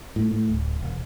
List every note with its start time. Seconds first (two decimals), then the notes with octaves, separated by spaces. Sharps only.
0.16 A2
0.31 A2
0.49 D1
0.82 E1